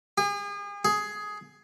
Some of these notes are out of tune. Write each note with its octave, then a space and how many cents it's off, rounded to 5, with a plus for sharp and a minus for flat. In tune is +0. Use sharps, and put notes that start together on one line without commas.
G#4 -40
G#4 +10